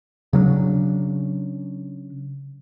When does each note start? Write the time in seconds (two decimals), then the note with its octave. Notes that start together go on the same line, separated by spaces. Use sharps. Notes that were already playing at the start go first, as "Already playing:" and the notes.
0.33 C#3 F#3 C#4 D4